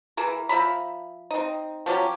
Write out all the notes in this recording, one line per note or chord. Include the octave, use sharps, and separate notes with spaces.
E3 G#4 A#4
F3 E5 A#5 B5
C4 D#4
F3 F#3 C#4 G4